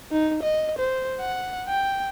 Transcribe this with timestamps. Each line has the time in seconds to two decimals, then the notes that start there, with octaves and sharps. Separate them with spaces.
0.12 D#4
0.43 D#5
0.79 C5
1.20 F#5
1.69 G5